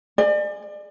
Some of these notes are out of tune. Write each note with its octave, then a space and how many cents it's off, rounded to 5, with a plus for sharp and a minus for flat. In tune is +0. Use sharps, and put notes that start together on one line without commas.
D5 +35 G#5 +0